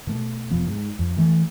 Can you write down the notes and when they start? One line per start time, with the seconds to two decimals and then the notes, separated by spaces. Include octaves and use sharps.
0.07 B2 A3
0.50 F1 F3 B3
0.68 G#2
0.99 F2
1.17 E3 A3